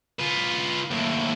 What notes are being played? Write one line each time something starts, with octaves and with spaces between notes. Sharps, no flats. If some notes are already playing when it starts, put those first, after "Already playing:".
F4 B4
D#2 A2